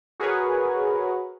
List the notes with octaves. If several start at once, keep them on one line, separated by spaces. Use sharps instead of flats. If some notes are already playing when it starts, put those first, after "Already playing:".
F#4 G#4 A#4 B4 C#5